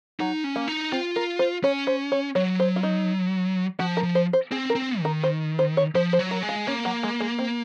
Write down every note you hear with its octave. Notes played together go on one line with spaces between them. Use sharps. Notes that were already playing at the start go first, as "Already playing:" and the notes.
F#3 D#4
C#4
A#3
D#4
C4 F4
A#4
C5
C#4 C#5
C5
C#5
F#3 C#5
C5
F4
D#4
F3 F#4
A#4
F3
C5
C5
C4 G#4
A#4
C4
D#3
A#4
C5
C5
C#5
F3 C5
C5
F#3
A#4
G#3
F4
A#3 C#4
F#3
G#3
G#3
C4